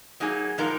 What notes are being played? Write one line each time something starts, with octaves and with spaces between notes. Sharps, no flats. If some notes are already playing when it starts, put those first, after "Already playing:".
F#3 A#3 D#4 G#4
A#2 F3 G#3 D#4 A#4